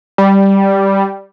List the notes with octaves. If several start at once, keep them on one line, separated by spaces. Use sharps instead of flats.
G3